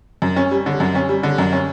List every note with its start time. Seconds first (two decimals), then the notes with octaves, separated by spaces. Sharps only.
0.22 F#2
0.36 C#4
0.51 G3
0.66 D3
0.80 F#2
0.95 C#4
1.09 G3
1.23 D3
1.38 F#2
1.52 C#4